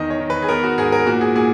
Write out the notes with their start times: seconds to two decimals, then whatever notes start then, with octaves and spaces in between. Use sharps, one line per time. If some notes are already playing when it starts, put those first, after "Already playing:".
Already playing: E2 D#3 D#5
0.10 C#5
0.20 D#3
0.30 B4
0.42 G#4
0.49 B3 A#4
0.64 F#4
0.78 G#2 G#4
0.92 A#4
1.06 A#2 F#4
1.21 G#4
1.35 A#2 G#4